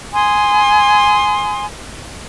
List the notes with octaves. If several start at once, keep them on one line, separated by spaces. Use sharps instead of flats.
G#5 C6 D#6